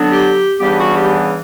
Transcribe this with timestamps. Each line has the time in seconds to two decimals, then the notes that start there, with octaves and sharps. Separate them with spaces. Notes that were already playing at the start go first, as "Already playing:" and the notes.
Already playing: D3 F#3 B3 D4
0.09 G4
0.60 C#3 E3 G3 B3 D4 G4
0.78 F#4
0.95 G4